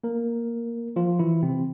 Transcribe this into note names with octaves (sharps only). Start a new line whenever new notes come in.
A#3 A#4
F3 F4
E3 E4
C3 C4